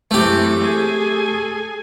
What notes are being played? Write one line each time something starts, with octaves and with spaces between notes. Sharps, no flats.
F#2 C3 E3 A3 G4
G#4 A4 G#5